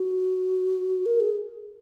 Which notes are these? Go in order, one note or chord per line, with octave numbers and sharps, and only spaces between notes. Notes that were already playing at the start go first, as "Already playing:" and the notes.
Already playing: F#4
A#4
G#4